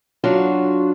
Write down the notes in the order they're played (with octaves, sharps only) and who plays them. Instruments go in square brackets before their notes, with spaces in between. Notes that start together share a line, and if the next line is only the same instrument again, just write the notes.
[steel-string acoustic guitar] F#3 D4 F4 F#4